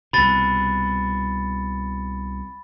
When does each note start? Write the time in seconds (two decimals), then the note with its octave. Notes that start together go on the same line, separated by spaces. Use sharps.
0.13 C2 B2 B5 A6